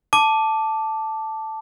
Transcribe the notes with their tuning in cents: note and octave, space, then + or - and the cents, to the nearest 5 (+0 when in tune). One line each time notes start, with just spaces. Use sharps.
A5 +0 D6 +0